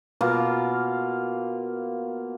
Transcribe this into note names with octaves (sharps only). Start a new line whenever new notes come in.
B2 A#3 F4